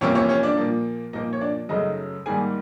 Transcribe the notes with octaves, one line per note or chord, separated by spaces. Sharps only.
E2 C3 F3 A#3 C#4 C#5
C#4 C#5
C#4 C#5
D4 D5
A#2 F3 A#3
A#2 F3 A#3 D#4 D#5
C#5
D4 D5
F#2 C#3 F#3 A3 D#4 D#5
G#2 D#3 G3 A#3 G#4 G#5